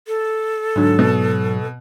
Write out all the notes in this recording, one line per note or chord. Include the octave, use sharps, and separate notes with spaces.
A4
G#2 D3 F#3
B2